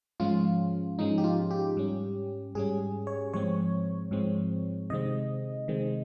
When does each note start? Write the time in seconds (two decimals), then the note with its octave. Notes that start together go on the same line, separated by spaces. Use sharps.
0.20 G#2 F3 G#3 C#4 F4
0.99 G#2 F3 G#3 C#4 D#4
1.18 G4
1.24 F4
1.51 G4
1.77 G#2 G3 C#4
2.55 G#2 G3 C#4 G#4
3.07 C#5
3.33 G#2 F3 G#3 C4 C#5
4.11 G#2 F3 G#3 C4
4.90 C3 D#3 G#3 C4 D#5
5.68 C3 D#3 G#3 C4